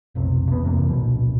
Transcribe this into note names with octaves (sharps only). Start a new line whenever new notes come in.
F1 B1 C3
E2 B3
F2 C3 E3 A#3
D1 A#1 B2